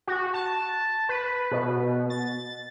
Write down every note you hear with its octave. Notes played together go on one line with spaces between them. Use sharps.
F#4
A5
B4
B4
B2
A6